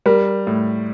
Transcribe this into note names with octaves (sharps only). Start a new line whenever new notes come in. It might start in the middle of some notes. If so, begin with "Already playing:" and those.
G3 A#4
A2